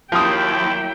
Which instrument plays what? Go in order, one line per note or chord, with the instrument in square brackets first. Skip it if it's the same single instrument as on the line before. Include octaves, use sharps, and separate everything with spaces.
[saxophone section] D#2 [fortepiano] F3 D#6 [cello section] F#3 A#3 E4 [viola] G5